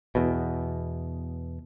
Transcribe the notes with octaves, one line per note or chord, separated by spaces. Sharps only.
E2 B2